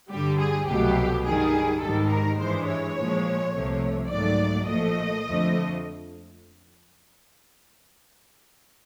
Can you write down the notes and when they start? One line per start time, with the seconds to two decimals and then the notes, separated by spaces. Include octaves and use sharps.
0.11 G2 D3 G3 G4
0.39 G#4
0.67 C2 B2 F#3 A3 G4
1.26 G2 D#3 G3 G#4
1.82 G#2 D#3 G3 A4
2.11 A#4
2.39 G2 E3 G#3 C5
2.68 C#5
2.97 A#2 F3 G#3
3.53 C2 C3 F3 A3
4.10 G#2 D#3 F#3 A3 D5
4.67 A#2 F3 A3 D#5
5.25 F2 D3 F3 A3